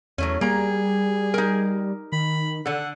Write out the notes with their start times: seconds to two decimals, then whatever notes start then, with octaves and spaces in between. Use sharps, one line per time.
0.18 E2 F#3 A3 C#4
0.41 G3 A#3 G#4 A#5
1.34 D#4 A#4
2.12 D#3 B5
2.66 D3 A4 F#5